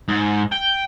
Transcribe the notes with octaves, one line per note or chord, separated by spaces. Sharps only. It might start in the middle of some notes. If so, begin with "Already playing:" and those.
G#2
G5